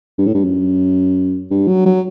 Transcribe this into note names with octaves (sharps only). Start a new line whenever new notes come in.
G2
A2
G2
F#2
G2
F#3
F#3